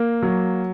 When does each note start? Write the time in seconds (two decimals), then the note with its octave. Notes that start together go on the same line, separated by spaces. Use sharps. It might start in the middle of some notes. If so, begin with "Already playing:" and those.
Already playing: A#3
0.22 F#3